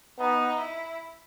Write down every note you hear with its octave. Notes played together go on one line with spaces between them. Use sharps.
B3 D#4
E4